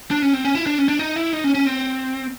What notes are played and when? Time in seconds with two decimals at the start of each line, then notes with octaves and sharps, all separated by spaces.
0.11 D4
0.22 C#4
0.33 C4
0.45 C#4
0.55 E4
0.66 D4
0.78 C#4
0.89 D4
0.99 D#4
1.16 E4
1.33 D#4
1.44 C#4
1.55 C#4
1.66 C4